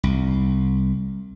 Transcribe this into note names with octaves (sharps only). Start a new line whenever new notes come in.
C2